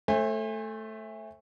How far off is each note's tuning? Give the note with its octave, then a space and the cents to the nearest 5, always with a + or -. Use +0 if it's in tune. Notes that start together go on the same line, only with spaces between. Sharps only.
A3 +0 C5 +40 G#5 -30